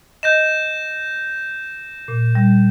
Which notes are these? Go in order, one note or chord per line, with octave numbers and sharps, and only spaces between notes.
D#5 G6 A#6 E7
A#2
G3